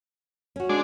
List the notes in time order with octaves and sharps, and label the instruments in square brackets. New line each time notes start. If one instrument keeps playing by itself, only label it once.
[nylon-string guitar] C#4 F#4
[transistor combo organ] G#3 D4